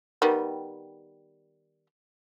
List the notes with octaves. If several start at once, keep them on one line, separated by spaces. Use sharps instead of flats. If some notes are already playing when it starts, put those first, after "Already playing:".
D#3 G3 B3